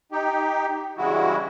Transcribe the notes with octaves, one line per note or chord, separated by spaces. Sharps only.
D#4 G4
G2 C#3 E3 G#3 E4 F#4